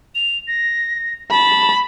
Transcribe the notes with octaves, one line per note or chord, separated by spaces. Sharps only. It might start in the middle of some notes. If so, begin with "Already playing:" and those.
F7
A#6
A5 B5